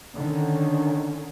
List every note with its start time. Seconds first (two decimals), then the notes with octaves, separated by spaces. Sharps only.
0.14 D3 D#3 C#4